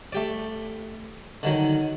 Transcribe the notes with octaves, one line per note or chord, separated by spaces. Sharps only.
A3 G4 D5
D3 D#3 F#3